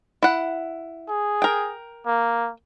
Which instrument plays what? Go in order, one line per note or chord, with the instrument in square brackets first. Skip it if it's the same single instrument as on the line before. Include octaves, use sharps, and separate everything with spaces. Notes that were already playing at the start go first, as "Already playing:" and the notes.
[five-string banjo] E4 F#5
[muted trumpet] G#4
[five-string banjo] A#4 G5
[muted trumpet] A#3